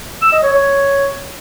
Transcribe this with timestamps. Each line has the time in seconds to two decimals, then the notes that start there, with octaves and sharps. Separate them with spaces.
0.22 E6
0.32 D#5
0.43 C#5
0.53 C#5